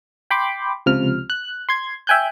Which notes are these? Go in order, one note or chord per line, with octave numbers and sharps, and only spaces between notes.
G5 B5 C6 D6
C#2 C3 F3 F6
F#6
C6 G#6
E5 G5 G#5 F#6 G6